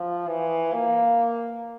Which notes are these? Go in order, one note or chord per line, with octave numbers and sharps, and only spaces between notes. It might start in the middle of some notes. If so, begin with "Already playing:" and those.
Already playing: F3
E3
A#3